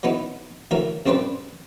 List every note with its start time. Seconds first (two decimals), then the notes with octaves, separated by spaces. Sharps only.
0.03 F#3 B3 D#4 E4
0.71 D2 E3 F#3 A#4 E5
1.06 C2 F#2 C4 D4 B4 B5